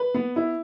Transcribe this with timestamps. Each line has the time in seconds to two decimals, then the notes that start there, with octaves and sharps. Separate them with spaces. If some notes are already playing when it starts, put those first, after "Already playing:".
Already playing: B4
0.14 B3
0.36 E4